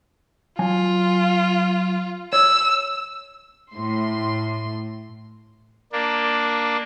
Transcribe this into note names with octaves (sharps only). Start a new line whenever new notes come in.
F#3 F4 G#5
C#5 E6
A2 C6
A#3 D4